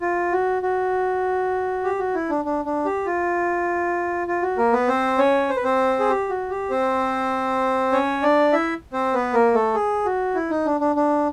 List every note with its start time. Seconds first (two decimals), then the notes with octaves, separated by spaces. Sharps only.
0.01 F4
0.32 F#4
0.62 F#4
1.84 G4
1.99 F#4
2.15 E4
2.30 D4
2.45 D4
2.65 D4
2.85 G4
3.06 F4
4.27 F4
4.42 F#4
4.58 A#3 A#4
4.73 B3 B4
4.88 C4 C5
5.18 C#4 C#5
5.49 C5
5.56 B4
5.64 C4 C5
6.00 G#4
6.09 G4
6.30 F#4
6.50 G4
6.70 C4 C5
7.92 C#4 C#5
8.22 D4 D5
8.53 E4 E5
8.93 C4 C5
9.14 B3 B4
9.34 A#3 A#4
9.54 A3 A4
9.74 G#4
10.05 F#4
10.35 E4
10.50 D#4
10.66 D4
10.80 D4
10.96 D4